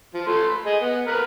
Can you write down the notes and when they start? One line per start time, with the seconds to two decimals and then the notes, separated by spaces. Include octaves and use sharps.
0.14 F3
0.27 A3 C6
0.49 B5
0.66 G#4 D#5
0.81 B3
1.06 A#3 A#4 B4